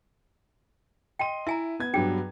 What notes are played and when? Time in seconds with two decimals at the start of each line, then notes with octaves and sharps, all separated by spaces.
1.19 D#5 G5 C6 D#7
1.47 E4 E5 G#5 A#5
1.80 B3 G#6
1.94 G2 F#3 B3 D4 G#4 G5